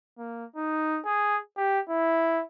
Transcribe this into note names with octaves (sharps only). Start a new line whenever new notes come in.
A#3
D#4
G#4
G4
E4